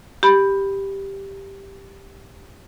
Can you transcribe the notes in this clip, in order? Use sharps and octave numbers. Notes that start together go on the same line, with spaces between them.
G4 B5